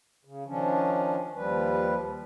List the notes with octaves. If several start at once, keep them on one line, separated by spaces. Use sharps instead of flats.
C#3
D#3 F3 C#4 D4
D#2 F3 G3 B4